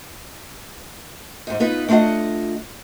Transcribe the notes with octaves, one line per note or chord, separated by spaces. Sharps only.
G#2 D#4
B3 D#4 F4 B4
A3 D4 F4 D#5 F#5